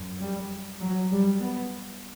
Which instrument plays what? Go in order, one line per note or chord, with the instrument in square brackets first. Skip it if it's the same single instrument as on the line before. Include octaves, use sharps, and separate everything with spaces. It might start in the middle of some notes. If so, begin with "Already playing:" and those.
Already playing: [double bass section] F#2
G3
F#3
G3
B3